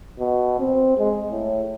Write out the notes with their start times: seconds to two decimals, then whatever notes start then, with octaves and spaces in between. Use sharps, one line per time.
0.19 B2
0.60 C4
0.98 G#3
1.31 A2